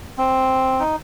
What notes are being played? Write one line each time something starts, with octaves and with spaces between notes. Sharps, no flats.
C4
D#4